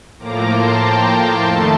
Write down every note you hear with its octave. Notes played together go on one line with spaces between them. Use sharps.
A2 F3 A#3 A#5 D6
A5 C6
G5 A#5
F2 D#3 A3 A5 C6